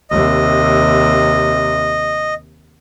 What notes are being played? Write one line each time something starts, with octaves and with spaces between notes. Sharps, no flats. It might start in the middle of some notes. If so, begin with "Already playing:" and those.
D#2 C3 D#5